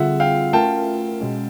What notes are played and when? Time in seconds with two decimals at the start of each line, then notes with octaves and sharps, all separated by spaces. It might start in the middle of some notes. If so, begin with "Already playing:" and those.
Already playing: D3 G3 C4 F4 G#4 E5 F#5
0.20 F5 G5
0.53 A3 C#4 F4 A#4 G5 A5
1.21 B2 G#3 C#4